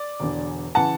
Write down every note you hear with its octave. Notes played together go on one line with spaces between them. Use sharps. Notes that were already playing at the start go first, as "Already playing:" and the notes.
Already playing: D5
E1 E2 D3
C#3 E3 F#5 A5